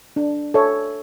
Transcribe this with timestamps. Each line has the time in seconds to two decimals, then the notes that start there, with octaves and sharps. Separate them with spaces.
0.16 D4
0.54 A4 C#5 E5